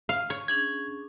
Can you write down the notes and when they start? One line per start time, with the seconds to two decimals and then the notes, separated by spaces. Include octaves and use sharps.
0.09 F5
0.30 C#5
0.48 C#4 D4 G#4 G#6